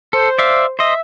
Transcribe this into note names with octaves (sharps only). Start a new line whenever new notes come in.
A4 C5
D5 E5 F5
C5 D#5 E5